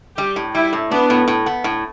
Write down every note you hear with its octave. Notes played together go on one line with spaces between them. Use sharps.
G3 G4
A2
G3 E4
A2
B3 D4
A2
A2
B3
A2